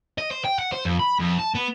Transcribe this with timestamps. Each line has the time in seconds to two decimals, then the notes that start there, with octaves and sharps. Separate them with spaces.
0.18 D#5
0.31 C5
0.45 G5
0.59 F#5
0.72 C5
0.85 F2
1.00 B5
1.20 F2
1.39 A5
1.55 B3